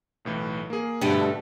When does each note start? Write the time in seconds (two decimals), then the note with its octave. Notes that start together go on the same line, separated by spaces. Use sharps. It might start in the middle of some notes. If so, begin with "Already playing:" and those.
0.25 B1 A2 E3
0.70 A#3 G#4
1.01 G2 B2 D3 A3